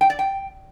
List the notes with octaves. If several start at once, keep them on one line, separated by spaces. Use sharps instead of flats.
G5
D5
G5